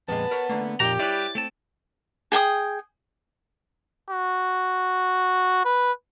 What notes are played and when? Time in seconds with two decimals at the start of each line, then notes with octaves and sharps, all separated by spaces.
0.08 F2 A#2 G#3 B3 A5
0.31 A#4 B4 C#5
0.49 D3 A3 A#3
0.80 F2 A#2 D#4 G4 A#5
0.99 G3 E4 B4 C#5 D5 A6
1.35 A3 C4 A5
2.32 G#4 G5 G#5 D#6
4.11 F#4
5.65 B4